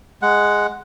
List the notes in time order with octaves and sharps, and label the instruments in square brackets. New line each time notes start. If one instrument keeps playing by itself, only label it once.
[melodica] G#3 F#5